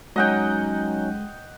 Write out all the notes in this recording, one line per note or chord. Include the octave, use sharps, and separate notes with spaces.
F#3 G#3 C#4 D#4 D#5 F#5 G5